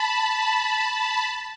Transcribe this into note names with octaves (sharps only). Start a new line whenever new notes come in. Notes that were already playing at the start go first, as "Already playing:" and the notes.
Already playing: A5 B5
A5 B5